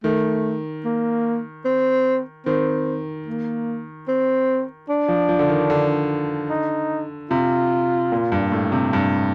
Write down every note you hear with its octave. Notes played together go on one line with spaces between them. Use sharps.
D#3 A3
A#3
C4
D#3 C4
A#3
C4
D4
F3
F3
D3
D#3
D3
D#4
C3 F4
A#2
G2
A2
C3
G2